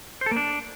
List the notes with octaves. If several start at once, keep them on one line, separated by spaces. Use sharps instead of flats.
C5
A4
A#3
D4